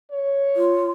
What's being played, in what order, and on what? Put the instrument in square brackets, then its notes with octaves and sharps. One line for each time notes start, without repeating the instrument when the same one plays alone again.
[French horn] C#5
[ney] F4